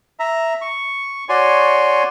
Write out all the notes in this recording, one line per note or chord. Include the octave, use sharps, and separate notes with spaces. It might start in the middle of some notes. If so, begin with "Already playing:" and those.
E5 A#5
C#6
F#4 C#5 D5 G#5 C6